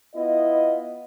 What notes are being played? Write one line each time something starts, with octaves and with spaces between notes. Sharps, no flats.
B3 E4 F4 D#5